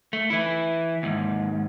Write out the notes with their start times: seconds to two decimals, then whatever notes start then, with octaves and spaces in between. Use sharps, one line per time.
0.13 A3
0.30 E3 E4
1.03 D#2 G#2